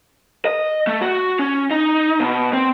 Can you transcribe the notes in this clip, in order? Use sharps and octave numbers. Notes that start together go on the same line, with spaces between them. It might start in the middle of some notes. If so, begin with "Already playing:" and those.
D#5
A3
F#4
C#4
D#4
B2
C4